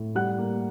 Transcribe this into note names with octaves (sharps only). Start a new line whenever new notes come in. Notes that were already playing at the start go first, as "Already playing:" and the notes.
Already playing: A2
G3 F#5 F#6
A#3